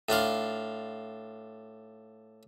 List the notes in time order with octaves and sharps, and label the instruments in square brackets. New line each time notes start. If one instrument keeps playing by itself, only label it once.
[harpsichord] A2 D4 F4 F5